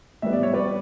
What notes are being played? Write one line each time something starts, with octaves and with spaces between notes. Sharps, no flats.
A2 G3 B3 E5
D5
C#5
B4 D5